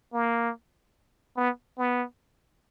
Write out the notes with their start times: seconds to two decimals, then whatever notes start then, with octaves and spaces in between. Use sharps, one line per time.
0.13 A#3
1.37 B3
1.78 B3